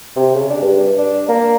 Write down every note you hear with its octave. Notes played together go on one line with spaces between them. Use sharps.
C3
C#3
D4
G2
D4
A#3